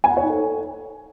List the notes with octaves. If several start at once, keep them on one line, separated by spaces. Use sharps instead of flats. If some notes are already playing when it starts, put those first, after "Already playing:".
G#5
F#5
C#5
D#4
A4